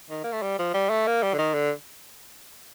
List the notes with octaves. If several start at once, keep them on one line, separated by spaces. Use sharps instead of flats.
D#3
A#3
A3
G3
F3
G3
A3
A#3
G3
D3
D#3
D3